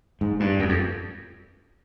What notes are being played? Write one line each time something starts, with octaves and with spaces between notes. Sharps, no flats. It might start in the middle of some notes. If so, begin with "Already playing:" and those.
G#2
G2
F#2
F2